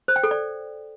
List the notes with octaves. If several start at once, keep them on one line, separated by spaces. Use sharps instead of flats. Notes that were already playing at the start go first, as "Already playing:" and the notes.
C5
G5
A4
D5